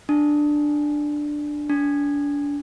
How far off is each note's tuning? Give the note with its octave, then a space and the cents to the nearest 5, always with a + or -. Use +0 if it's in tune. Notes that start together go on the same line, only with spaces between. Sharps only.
D4 +10
D4 -30